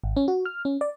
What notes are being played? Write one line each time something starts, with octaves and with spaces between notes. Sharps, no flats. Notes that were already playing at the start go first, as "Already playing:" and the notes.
G#1
C#4
F#4
F6
C#4
D5